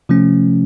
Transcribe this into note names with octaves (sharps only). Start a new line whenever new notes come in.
C3 F3 A3 C#4